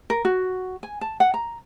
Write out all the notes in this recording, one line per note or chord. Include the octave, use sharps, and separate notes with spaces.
A#4
F#4
G#5
A5
F#5
A#5